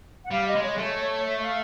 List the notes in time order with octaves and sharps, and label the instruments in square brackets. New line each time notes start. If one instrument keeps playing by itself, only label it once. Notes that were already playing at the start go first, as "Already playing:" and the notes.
[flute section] F#5
[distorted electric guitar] G3 [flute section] F5
[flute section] D#5
[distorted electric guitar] G#3
[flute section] C#5
[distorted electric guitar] A3
[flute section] E5
F5